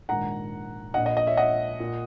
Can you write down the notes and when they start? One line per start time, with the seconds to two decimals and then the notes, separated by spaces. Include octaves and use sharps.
0.08 A#1 G#2 D#3 F#5 A#5
0.94 A#1 A#2 D#5 F#5
1.06 D#5
1.17 D#5
1.27 C#5 E5
1.37 D#5 F#5
1.80 A#2